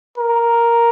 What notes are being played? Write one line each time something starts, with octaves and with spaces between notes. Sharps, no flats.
A#4